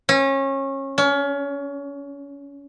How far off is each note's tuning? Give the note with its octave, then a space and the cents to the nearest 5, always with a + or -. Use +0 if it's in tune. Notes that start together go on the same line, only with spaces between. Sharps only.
C#4 -25
C#4 +30